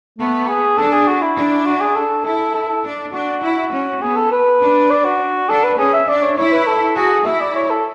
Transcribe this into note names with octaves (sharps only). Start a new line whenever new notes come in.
A3 B3
G#4
D4 A4
G#4
F#4
E4
D4
F#4
G#4
A4
E4 A4
A4
A4
D4
D4 F#4
E4
C#4
B3 G#4
A4
B4
D4
D5
F#4
D4 A4
B4
C#4 G#4
E5
D4 D5
C#5
E4 C#5
B4
A4
F#4 G#4
E4 E5
D5
C#5
A4